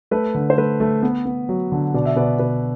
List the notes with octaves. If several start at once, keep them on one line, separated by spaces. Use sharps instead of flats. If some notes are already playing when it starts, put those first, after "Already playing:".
A3 B4
D3
C5
A3 B4
A3
B3
B3
F#3
D3
B2 D5
E5
B2 B4 D5
B2 B4